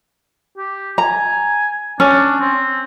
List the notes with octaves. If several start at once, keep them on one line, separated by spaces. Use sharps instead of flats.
G4
G#5 A#5
C#4 D4
C4